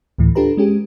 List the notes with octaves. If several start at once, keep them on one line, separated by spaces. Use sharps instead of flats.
D2 A2 E3
D4 F4 G4 A4 B4 A#5
G#3 C#4 G4 G#4